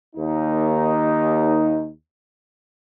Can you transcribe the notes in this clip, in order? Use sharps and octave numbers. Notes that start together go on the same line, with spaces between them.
D#2 D#4